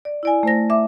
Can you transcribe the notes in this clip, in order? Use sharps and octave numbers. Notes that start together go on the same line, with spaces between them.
D5
E4 D5 G#5
A3 C5 A#6
E5 D6